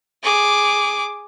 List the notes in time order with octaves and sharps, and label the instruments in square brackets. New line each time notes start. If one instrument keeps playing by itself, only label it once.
[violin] G#4 D6